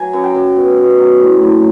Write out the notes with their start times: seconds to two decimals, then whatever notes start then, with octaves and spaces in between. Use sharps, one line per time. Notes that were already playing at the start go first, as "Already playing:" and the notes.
Already playing: F#3 G#5
0.13 F#2
0.24 G5
0.35 F#2
0.56 B2
0.77 B2
0.98 F#3
1.20 A2
1.41 A2